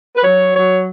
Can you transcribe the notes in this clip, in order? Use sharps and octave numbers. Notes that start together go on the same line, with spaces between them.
B4
F#3 C#5
F#3 C#5